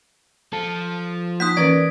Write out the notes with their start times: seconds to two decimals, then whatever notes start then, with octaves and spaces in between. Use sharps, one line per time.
0.53 F3 A4
1.40 A#3 D#4 D#6 F#6 B6
1.57 E3 C#4 A#4 B4 D5 G#6